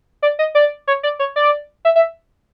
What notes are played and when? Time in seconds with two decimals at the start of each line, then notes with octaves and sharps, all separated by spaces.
0.22 D5
0.39 D#5
0.55 D5
0.87 C#5
1.03 D5
1.19 C#5
1.36 D5
1.85 E5
1.95 E5